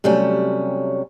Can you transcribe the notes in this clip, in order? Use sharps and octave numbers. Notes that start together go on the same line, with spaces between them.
C3 F#3 G3 A3 C#4